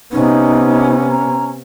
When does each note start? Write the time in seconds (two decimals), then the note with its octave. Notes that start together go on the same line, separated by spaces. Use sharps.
0.13 C3 B3 C#4 D#4
1.10 A#5